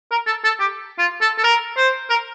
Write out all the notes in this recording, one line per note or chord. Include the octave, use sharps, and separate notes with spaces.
A#4
A4
A4
G4
F4
A4
A4
A#4
C5
A#4